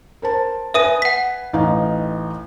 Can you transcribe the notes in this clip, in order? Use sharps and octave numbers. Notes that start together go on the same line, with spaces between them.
A#4 C5 A5
B4 E5 G#5 D#6 A#6 D#7
F#5 B6
A1 D#4 F5